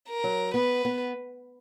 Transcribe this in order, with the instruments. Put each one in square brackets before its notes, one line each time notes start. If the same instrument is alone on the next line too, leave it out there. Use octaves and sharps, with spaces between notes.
[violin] A#4
[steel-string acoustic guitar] F#3
[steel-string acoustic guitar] B3 [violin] B4
[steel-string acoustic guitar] B3